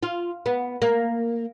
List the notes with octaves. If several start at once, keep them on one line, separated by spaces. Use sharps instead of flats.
F4
B3
A#3